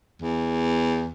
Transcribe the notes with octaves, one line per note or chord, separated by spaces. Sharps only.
E2